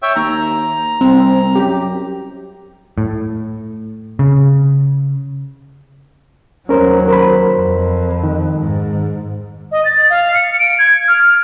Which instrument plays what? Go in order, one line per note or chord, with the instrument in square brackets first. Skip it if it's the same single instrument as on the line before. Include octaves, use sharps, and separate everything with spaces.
[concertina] C#5 E5 G5
[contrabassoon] D#2 [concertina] A#5
[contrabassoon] C2 [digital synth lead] C4
[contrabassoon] F#2 [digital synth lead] G4
[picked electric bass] A2
C#3
[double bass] D#2 F#3 [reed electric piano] C#4 A#4 C5
[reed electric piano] A#4 C5 B5
[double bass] F2
[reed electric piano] D#3
[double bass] G#2
[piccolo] D#5
A6
F5
C#7
D7
G#6
F6